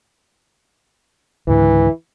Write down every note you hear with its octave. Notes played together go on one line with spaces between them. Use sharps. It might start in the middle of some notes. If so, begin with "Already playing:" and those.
C#2 G#2 D3 E3